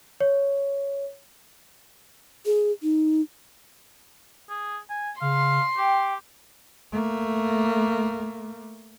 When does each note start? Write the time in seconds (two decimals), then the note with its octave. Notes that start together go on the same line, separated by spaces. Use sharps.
0.21 C#5
2.46 G#4
2.83 D#4
4.49 G#4
4.90 G#5
5.21 C#3 F5 C6
5.77 G4 G5
6.92 A3 A#3